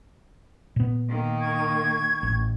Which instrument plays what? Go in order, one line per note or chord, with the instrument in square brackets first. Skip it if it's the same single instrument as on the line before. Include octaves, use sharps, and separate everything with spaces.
[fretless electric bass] A#2 B3
[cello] D#3 A#3
[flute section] C#6 G#6
[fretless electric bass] A1